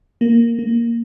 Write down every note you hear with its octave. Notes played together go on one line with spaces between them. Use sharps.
A#3
A#3